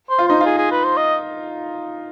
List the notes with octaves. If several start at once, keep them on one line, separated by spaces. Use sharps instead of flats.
C5
F4
D#4 C5
F4 G#4
G#4
B4
C5
D#5